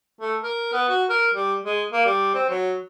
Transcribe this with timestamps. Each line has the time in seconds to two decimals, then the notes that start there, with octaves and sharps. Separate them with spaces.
0.21 A3
0.43 A#4
0.73 B3
0.89 F#4
1.09 A#4
1.34 G3
1.65 G#3
1.92 A#3
2.06 G3
2.35 C4
2.49 F#3